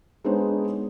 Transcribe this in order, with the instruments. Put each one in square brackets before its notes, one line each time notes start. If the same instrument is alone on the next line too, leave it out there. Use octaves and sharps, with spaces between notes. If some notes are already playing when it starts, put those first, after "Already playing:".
[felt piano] G#3 B3 D4 D#4 C5 C#5